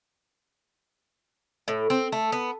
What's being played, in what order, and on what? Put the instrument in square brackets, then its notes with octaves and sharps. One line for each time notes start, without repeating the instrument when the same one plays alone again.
[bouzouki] A2
C4
A3
B3